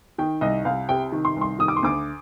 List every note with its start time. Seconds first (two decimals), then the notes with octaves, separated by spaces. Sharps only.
0.18 D#3 G5
0.41 C2 D#5
0.65 C2 F5
0.89 C3 G5
1.12 D#3
1.25 C6
1.36 C2
1.41 C6
1.59 D#3 D#6
1.68 D6
1.77 C6
1.83 D2 D6